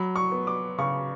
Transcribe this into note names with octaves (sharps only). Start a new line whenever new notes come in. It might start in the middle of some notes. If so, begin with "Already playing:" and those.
Already playing: F#3 B5
C#6
B3
D6
C#3 C#6